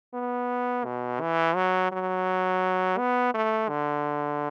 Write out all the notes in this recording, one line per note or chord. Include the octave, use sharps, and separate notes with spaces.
B3
B2
E3
F#3
F#3
B3
A3
D3